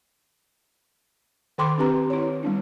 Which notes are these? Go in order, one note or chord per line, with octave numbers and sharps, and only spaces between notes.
D#3 A4 G5 B5 C6 D6
C4 D4 G4 B4 A#5
E4 C#5
G3 B3 D4